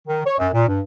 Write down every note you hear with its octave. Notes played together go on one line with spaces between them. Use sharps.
D#3
C#5
F#2
A#2
G2